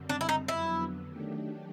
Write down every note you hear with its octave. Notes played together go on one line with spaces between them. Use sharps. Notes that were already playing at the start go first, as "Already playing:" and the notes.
Already playing: F#2 D3 G3 C4
D4
E4
D#4
F2 D3 F#3 B3 E4
D#3 F#3 A3 D4 G4